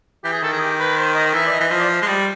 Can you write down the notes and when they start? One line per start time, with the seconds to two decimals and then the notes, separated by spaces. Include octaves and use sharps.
0.24 E3 G4
0.32 G#4
0.42 D#3 A4
0.52 G#4
0.61 G4
0.79 B4
0.97 C5
1.15 D#5
1.34 E3 E5
1.46 D5
1.52 D#5
1.60 E3
1.71 F3 D#5
1.80 D5
1.89 C5
2.02 G#3
2.07 G3